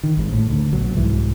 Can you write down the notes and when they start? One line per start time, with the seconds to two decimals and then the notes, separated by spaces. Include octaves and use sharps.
0.03 D#3
0.17 G#1 G#2
0.32 A2
0.50 D2
0.72 A#1 B2 F#3
0.94 C2 G#2 E3